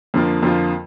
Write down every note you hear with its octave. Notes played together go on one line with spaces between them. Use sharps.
F2 D3 F3 A#3 F4
F2 D3 F3 A#3 F4